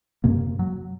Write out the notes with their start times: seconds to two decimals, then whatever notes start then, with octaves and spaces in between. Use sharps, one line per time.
0.24 F#2 C3 A#3
0.59 F#3